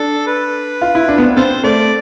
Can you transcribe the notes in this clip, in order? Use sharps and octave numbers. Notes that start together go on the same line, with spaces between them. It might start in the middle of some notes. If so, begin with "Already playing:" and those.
Already playing: D4 A4
B4
F4
E4
D4
B3
C4
C4 F4 A4 C5
A3 D5